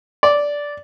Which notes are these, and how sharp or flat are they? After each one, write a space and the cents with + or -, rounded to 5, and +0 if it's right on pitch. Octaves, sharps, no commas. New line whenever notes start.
D5 -10